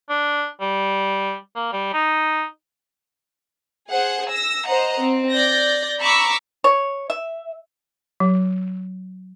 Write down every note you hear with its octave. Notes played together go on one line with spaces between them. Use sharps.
D4
G3
A#3
G3
D#4
G#4 C5 F#5
E6 A#6
C5 D#5 F#5 A#5
C4
D5 G6 A#6
A#5 B5 C#6 D6 E6
C#5
E5
F#3